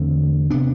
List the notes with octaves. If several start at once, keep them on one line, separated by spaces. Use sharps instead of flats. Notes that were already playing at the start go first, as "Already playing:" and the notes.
Already playing: E2 D3 A3 C4
C3 B3 D4